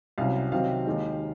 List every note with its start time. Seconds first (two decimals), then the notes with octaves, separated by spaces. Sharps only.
0.18 C2 C3 F#3 C#4 F5
0.52 C3 D#3 F#3 C4 F5
0.86 D#2 D#3 G#3 D#4